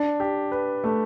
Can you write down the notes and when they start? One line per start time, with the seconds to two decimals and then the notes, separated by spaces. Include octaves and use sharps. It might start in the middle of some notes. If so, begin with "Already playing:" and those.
Already playing: D4
0.20 G4
0.52 B4
0.84 A3